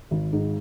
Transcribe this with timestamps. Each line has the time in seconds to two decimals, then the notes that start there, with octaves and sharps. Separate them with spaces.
0.11 G#1
0.33 G#2